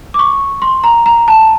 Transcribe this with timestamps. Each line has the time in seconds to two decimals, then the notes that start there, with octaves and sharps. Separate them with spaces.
0.14 D6
0.19 C#6
0.62 C6
0.84 A#5
1.06 A#5
1.28 A5